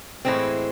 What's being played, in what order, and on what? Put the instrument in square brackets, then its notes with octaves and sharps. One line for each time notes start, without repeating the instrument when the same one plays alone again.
[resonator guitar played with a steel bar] A2 E3 G#3 C4